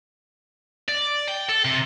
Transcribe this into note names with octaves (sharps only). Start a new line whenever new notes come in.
D5
G5
A4
C3